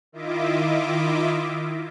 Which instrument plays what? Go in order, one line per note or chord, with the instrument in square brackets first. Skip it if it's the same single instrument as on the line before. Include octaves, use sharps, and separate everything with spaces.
[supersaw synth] D#3 E4 F4 D#5 E5 D6